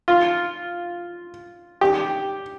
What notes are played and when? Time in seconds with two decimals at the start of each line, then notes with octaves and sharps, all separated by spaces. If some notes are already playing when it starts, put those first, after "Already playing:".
0.08 F4
1.81 G4